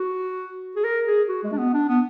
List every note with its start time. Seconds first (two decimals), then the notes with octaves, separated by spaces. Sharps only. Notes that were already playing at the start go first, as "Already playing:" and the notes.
Already playing: F#4
0.76 G#4
0.84 A#4
1.07 G#4
1.29 F#4
1.44 G#3
1.52 D4
1.58 B3
1.74 D4
1.89 B3